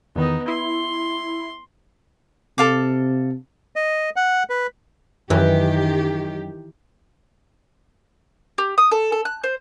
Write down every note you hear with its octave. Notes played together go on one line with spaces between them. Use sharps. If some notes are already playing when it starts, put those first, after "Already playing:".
E2 D#3 B3 D#4
E4 C6
C3 A4 F5 D6
D#5
F#5
B4
F#2 D#3 E3 G4
G4
D#6
A4
A4
F#6
C5